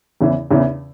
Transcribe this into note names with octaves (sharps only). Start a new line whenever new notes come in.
E2 C#3 E3
E2 C#3 E3